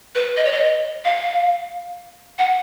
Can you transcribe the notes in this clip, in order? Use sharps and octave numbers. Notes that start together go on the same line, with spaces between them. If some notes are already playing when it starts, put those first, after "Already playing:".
B4
D#5
C#5
D#5
F5
F#5